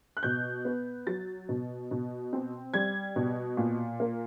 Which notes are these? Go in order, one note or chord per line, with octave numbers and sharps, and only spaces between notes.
F#6
B2 G6
B3
F#3 A6
B2
B2
C4
G3 G#6
B2
A#2
A#3